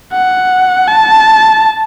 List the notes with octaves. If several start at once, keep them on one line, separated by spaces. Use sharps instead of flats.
F#5
A5